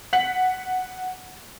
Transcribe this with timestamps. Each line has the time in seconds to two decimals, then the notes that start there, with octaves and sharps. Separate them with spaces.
0.13 F#5 B6 F#7